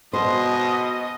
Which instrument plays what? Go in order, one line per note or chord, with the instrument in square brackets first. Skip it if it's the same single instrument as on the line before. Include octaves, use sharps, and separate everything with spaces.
[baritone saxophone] B2 [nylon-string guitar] C5 [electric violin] D#5